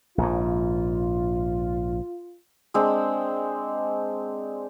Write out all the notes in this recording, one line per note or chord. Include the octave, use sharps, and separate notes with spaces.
A#1 G#2 F4
G#3 C4 D4